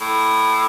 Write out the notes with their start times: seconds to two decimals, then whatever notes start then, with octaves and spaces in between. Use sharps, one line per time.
0.01 A2